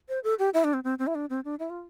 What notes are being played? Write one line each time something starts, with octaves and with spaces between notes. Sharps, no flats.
C5
A4
G4
E4
D4
C4
C4
C4
E4
D4
C4
D4
E4
F4